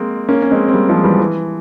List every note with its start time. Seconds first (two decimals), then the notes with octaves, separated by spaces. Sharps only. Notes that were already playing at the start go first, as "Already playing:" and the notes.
Already playing: G#3 A#3 C4
0.29 A#3 C#4
0.42 C#4
0.51 G#3 C4
0.68 C4
0.74 G3 A#3
0.89 F3 G#3
1.04 E3 G3
1.19 E3